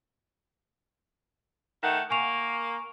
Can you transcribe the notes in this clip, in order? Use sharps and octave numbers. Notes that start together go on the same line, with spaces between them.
D#3 A3 F#5
A#3 G#5 C#6 F7